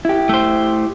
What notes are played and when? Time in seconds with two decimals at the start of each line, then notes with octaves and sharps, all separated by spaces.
0.05 E4 G4
0.29 A3 C5